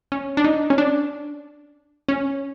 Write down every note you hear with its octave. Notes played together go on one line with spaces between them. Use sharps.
C#4
D4
D#4
C#4
D4
C#4